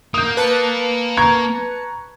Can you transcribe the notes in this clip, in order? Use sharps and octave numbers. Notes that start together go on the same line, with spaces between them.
A#3 D#6 G6
B4 A5 C#7
A#5 C#6 G#6